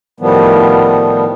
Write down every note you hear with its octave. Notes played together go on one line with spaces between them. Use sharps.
A2 D#3 F3 G3 B3